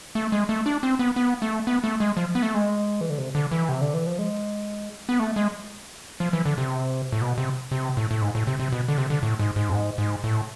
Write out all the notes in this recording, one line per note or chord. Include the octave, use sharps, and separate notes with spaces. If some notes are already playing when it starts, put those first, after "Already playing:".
A3
G#3
A3
D4
C4
B3
B3
A3
B3
A3
G#3
F3
B3
A3
G#3
E3
D3
C3
D3
E3
C3
D3
E3
F3
G#3
B3
A3
G#3
F3
E3
D3
C3
A2
B2
C3
C3
A2
A2
G#2
A2
C3
C3
B2
D3
C3
D3
A2
G#2
G#2
F2
G#2
G#2
A2